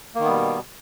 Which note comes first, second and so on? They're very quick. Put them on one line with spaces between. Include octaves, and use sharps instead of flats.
A#3 D#3 B3 G3 B2